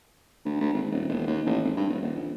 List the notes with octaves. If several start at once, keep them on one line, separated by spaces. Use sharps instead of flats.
D2
D2
G#1
D#1
E1
D#2
A1
G#1
G2
D#1
D#1
A#1